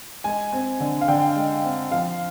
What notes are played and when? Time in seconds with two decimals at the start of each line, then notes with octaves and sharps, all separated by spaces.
0.24 G#3 G#5
0.53 C4
0.80 D3
1.01 F5
1.08 D3 G5
1.36 G#3
1.64 C4
1.91 F3 F5